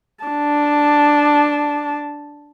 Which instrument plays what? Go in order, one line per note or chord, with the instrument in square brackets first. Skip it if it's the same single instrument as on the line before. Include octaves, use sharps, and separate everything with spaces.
[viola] D4 A5